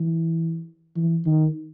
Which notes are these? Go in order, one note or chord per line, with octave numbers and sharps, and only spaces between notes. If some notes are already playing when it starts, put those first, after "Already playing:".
Already playing: E3
E3
D#3